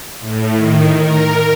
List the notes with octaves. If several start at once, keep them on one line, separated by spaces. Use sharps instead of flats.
A2
D#3
A#4